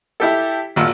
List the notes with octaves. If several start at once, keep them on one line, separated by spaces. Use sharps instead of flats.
E4 G4 A4
G#1 A#2 F#4 E6